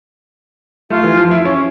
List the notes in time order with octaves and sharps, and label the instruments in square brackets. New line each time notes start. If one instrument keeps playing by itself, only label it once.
[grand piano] A3 [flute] F4
[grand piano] E3
F3
E4
C#4